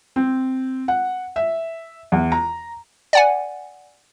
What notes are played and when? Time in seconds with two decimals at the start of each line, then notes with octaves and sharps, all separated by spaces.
0.16 C4
0.88 F#5
1.36 E5
2.12 E2
2.32 A#5
3.13 D5 F#5 G#5